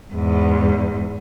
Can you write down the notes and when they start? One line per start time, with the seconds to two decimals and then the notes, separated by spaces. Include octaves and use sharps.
0.13 E2 G#2